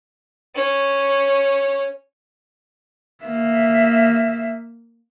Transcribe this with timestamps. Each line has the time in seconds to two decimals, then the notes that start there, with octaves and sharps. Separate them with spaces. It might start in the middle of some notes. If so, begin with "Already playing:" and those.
0.55 C#4 C#5
3.25 A#3 E5